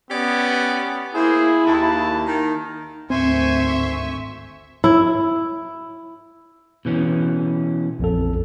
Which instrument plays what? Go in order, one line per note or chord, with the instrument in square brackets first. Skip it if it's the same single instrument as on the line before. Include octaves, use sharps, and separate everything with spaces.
[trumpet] B3 [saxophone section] C#4 G4 D5
[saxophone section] A#3 C5 [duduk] E4 [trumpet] G#4
[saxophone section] D#2 [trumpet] A5
[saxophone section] D#3
[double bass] G#1 D2 [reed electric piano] C4 [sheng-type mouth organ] C5 G#5 [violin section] E5 C#6
[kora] E4
[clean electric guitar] B2 E3 C#4
[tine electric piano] A#1 F2 A4